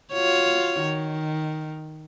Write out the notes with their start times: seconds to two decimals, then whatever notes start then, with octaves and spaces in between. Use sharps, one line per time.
0.13 F4 F#4 C#5
0.82 D#3